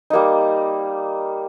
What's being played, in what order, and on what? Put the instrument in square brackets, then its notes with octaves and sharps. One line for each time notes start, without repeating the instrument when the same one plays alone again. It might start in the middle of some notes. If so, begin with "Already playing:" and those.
[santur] G3 A#3 D#4